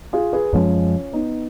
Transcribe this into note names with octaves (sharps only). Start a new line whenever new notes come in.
F4 G#4
G#4 B4
F#2 F3 G#3 C#4 F4
B3 D#4